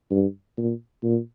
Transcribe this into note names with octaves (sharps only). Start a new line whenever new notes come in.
G2
A#2
A#2